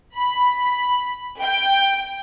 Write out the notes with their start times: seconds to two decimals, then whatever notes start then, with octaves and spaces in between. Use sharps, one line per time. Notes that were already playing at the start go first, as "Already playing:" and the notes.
0.15 B5
1.41 G5